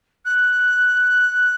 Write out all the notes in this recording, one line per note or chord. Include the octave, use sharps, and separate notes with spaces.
F#6